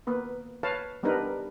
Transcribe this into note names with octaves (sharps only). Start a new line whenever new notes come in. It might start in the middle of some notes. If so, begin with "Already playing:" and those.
A#3 B3 B4
B4 C#5 F5 A5
G3 B3 D4 D#4 A#4 B4